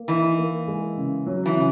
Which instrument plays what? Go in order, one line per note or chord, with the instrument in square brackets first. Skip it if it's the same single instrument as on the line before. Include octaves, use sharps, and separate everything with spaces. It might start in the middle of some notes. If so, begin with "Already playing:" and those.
Already playing: [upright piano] A#3
[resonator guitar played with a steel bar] E3 [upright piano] D#4
[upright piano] A#3
G#3
C#3
F#3
[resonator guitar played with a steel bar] E3
[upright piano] C#3